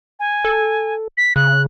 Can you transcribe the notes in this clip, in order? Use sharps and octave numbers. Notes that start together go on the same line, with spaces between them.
G#5
A4
B6
C#3 F#6